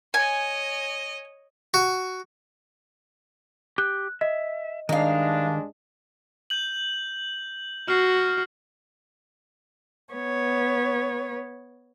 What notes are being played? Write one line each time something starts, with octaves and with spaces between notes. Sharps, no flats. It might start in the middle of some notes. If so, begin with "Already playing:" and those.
C#5 D#5 G#5
F#4
G4 F#6
D#5 E5
G2 D#3 G#3 D4 D#4 F5
G6 F#7
F#4 F6 C7
B3 C#5